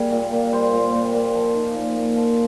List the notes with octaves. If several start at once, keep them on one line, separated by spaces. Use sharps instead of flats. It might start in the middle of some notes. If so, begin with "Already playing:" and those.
Already playing: G3 A#3 G#4
A#2
A#3
G3 C5
A#2
A#2
A#3
F3
D#4
A#2
A#3
F3